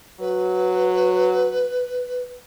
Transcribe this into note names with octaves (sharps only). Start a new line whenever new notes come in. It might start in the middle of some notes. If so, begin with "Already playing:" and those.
F#3 B4